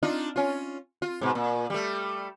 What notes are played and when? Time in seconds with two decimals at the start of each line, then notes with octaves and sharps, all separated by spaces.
0.03 D4 D#4 F4
0.36 C#4 F4
1.02 F4
1.21 G#2 B2
1.35 A#2
1.70 G3 A3